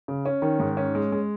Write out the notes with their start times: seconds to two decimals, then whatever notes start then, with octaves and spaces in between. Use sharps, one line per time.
0.08 C#3
0.26 C#4
0.42 D#3
0.60 G#2
0.77 C#4
0.95 G#3
1.12 G#3